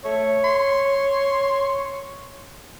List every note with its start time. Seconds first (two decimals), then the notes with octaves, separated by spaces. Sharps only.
0.05 A3 C#5
0.44 C6